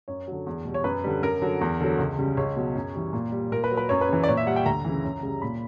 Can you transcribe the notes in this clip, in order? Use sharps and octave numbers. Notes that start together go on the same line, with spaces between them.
F#2 C#5
D3 F#3
E2
B2 G3
C#5
F#2 B4
D3 G3
F#2 A#4
D3 F#3
E2
D3 F#3
C#2
C#3 G3
C#2 C#5
B2 F#3
F#2
E3 G3
A#2
G3
A#2 A#4
B4
F#3
B4
F#2 C#5
B4
C#3 E3
D5
A#2 C#5
E5
G3 F#5
G5
D2 A#5
C#3 E3
F#2
C#3 G3
A#2 B5